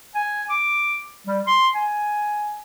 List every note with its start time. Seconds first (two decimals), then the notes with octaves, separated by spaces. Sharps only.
0.15 G#5
0.50 D6
1.27 G3
1.47 C6
1.75 G#5